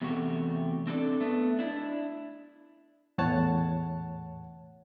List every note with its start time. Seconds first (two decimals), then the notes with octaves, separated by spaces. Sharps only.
0.01 E2 C3 A3 F#4 G4
0.87 C4 D4 A4 D5
1.21 A3 B3
1.59 D4 E4
3.18 E2 A2 C#5 F#5 A5